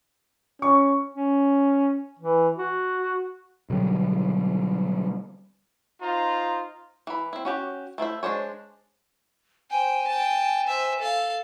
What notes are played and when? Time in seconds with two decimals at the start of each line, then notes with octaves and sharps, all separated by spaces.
0.62 C#4 C#6
1.15 C#4
2.19 E3
2.57 F#4
3.70 B2 D3 F#3 G3
6.01 D#4 F4 C5 A#5
7.07 E3 B5
7.33 C4 E4
7.45 C#4 F#4 G4
7.98 A3 E4 C5 E5
8.23 G#3 D4 C5 C#5
9.70 C5 G5 G#5
10.07 G5 A5
10.67 C5 E5
10.99 A4 F5